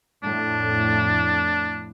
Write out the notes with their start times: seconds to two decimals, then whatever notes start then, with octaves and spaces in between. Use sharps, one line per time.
0.23 F2 A2 D4